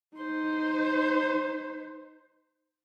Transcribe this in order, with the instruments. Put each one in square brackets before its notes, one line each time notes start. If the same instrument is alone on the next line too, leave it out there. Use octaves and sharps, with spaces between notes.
[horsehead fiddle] D#4 C5